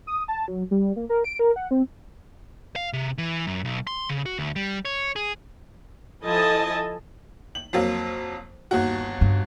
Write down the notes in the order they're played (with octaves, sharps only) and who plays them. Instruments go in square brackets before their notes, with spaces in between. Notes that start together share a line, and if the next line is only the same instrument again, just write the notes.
[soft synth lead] D#6
A5
F#3
G3
A#3
A#4
D7
A#4
F#5
C4
[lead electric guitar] F5
C3
E3
F#2
B1
C6
C#3
F#4
D2
G3
C#5
G#4
[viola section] F3 E4 A4 D#5 G#5 A5
[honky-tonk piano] F#7
F2 F#3 A#3
G1 D#2 F#4
[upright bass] G2